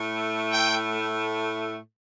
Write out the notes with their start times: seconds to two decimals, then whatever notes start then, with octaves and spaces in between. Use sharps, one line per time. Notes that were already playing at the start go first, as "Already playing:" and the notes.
Already playing: A2 A3
0.51 G5